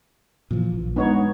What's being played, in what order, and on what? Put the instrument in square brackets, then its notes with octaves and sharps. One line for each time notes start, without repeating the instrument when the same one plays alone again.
[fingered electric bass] A#2 E3 F3
A#1
[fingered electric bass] G#3 D4 [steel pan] B3 D#4 C#5